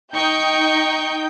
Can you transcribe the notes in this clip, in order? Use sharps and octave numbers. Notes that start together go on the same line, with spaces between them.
D#4 G5 C#6 G6